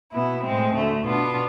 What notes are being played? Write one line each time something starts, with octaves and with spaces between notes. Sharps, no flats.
B2 B3 E4
A2 G#3 C4
D2 D3 A3
B2 B3 D4 F4